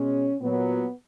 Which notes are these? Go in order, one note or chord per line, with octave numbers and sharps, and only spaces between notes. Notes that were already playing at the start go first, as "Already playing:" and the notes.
Already playing: B2 G#3 C#4
A#2 F#3 B3